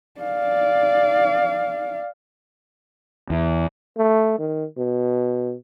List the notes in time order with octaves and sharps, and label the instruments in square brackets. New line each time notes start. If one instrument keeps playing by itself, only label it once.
[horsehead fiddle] D5 F5
[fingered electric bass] E2
[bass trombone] A3
D#3
B2